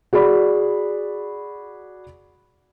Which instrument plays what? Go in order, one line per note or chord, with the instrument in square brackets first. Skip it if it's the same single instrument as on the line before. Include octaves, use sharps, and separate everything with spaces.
[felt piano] F#4 G#4 D5 B5